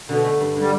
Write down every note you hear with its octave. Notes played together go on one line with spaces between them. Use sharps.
B2 D3
A3
G2
D3 G3